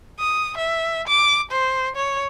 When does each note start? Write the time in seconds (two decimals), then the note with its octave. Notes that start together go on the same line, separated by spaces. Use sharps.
0.20 D#6
0.58 E5
1.08 D6
1.52 C5
1.96 C#5